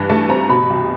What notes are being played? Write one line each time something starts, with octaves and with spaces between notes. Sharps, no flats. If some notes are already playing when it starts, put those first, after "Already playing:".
Already playing: G2 E3
A3 A5
C4 A#5
B2 B5
C2